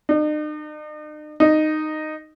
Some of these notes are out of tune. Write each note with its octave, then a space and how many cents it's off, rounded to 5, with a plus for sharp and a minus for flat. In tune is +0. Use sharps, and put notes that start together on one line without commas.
D#4 -45
D#4 -10